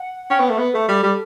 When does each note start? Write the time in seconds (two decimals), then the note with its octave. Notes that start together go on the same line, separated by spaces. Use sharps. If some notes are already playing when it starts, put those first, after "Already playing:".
Already playing: F#5
0.30 C#4 G5
0.39 B3
0.45 A3 F#5
0.58 B3 B4
0.74 A3 A4
0.89 G3
1.03 G3